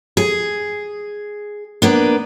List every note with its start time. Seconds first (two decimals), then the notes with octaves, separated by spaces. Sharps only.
0.17 G#4
1.82 A#3 B3 D4